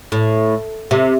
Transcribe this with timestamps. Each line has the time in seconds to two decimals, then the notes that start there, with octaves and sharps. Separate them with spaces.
0.12 A2
0.91 C3